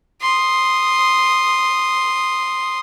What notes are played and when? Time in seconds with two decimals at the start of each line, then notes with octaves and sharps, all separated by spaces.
0.22 C6 D#6